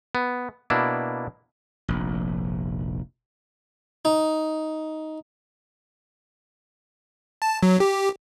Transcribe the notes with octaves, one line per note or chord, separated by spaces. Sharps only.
B3
B2 A#3 D4 E4
F1 A#1
D#4
A5
F#3
G4